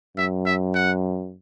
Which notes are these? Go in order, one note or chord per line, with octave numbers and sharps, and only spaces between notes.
F#2 E5
E5
F#5